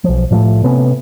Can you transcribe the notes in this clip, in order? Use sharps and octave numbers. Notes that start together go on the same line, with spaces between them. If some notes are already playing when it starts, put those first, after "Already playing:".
B1 F3
A2 F3 F#3 A3
C3 A3 B3 C#4